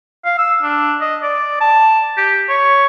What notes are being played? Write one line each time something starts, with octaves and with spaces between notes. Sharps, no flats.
F5
E6
D4
D#5
D5
A5
G4
C#5